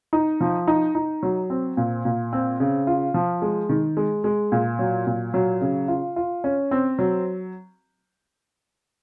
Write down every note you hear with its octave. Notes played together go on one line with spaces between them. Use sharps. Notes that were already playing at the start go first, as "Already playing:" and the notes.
D#4
F3
D#4
D#4
F#3
C4
A#2
A#2
C4
C#3
F4
F3
G#3
D#3
G#3
G#3
A#2
F#3
A#2
F#3
C#3
F4
F4
C#4
C4
F#3